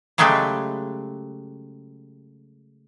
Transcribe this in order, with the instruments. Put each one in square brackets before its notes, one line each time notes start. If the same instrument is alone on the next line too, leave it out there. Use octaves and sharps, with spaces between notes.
[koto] C#3 F#3 G#3 A3 G4 B4